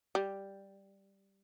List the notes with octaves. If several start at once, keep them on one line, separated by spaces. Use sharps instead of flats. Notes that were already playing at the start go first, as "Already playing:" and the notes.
G3